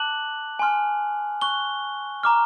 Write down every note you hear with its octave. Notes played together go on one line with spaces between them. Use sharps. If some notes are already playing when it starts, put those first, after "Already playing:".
Already playing: A5 D6 F#6 F#7
G#5 C6 F6
C#6 F#6 G7
A#5 D6 F6